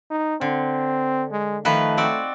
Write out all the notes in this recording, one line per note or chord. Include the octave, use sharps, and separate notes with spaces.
D#4
D3 C4
G#3
D#3 F3 A3 B4
C4 F#4 D5